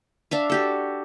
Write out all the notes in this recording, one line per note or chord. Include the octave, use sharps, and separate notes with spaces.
D4 E5 F5
F#4 G4 A4